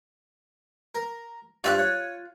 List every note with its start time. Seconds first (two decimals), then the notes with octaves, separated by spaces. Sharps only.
0.95 A#4
1.64 G2 F4 C5 E5 F6 F#6
1.78 C#5